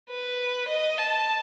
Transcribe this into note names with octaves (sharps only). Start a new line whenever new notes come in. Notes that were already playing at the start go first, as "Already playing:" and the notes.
B4
D#5
A5